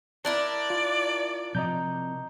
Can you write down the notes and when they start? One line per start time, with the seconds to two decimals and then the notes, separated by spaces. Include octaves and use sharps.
0.25 D4 E4 A#4 D5
0.70 F4
1.55 C3 F3 D#5 A#5 G6